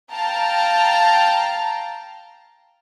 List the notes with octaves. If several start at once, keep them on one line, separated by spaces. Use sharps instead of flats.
F5 G5 A5 A#5